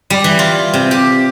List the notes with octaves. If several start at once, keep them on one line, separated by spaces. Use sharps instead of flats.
G3
E3
F4
C3
G4